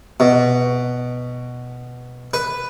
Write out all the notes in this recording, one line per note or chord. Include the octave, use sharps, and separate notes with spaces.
B2
B4